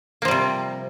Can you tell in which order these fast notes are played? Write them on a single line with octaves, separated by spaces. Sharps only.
A#3 F3 G3 C3